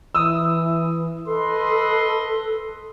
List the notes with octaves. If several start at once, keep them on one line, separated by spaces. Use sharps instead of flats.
E3 D#6 E6
A4 B4 D#5 C6